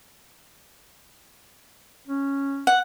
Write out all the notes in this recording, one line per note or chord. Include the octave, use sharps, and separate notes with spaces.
C#4
F#5